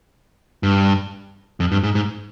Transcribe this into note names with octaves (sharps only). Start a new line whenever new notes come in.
G2
F2
G2
G#2
G#2